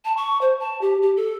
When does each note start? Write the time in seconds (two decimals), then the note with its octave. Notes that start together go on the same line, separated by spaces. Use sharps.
0.05 A5
0.17 C#6
0.41 C5
0.60 A5
0.81 G4
1.02 G4
1.17 A4